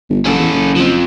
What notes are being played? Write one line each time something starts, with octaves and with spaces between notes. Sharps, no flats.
G1
F#1 C#4 A4
E2
F#1
F3 C4